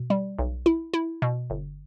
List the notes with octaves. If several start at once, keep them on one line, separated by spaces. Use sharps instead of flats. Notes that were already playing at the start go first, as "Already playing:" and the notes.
Already playing: B2
G3
B1
E4
E4
B2
G1